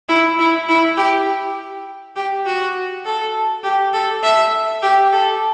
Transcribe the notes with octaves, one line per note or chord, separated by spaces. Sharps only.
E4
E4
E4
G4
G4
F#4
A4
G4
A4
E5
G4
A4